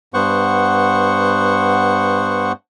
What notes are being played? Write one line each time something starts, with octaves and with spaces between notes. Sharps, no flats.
G2 B3 C5 F#5 C#6